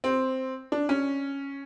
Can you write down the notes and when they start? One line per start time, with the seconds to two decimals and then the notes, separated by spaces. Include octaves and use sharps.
0.04 C4
0.72 D4
0.89 C#4